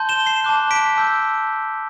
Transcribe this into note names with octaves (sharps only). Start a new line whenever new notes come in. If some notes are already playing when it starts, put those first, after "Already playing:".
Already playing: A5 C6 G6
E7 G7
C7 E7
A5 D6 F#6
B6 D7
A5 E6 G6